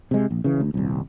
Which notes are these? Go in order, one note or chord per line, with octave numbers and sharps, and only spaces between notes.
C3 G#3
A#1
C#3 E3
D2
D#1 C2